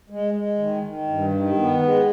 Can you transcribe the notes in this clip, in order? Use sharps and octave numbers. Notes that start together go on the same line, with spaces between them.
G#3
G#3
D#3
D#3
G2
D#3
B3
G#3